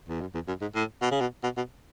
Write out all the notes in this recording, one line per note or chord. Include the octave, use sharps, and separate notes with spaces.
E2
F#2
E2
F#2
G#2
A2
B2
C#3
B2
B2
B2